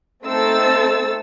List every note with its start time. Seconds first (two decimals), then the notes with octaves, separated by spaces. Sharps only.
0.24 A3 C4 D#4 A4 E6 A6